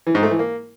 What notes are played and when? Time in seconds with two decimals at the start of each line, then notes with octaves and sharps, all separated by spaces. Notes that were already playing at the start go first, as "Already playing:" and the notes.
0.07 E3
0.15 G#2
0.23 A3
0.31 E3
0.39 A#3